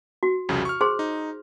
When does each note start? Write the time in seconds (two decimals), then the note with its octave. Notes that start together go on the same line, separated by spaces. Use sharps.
0.23 F#4
0.49 C2 F2 C#3
0.65 C#6 F6
0.81 G#4 C5 C6
0.99 D#4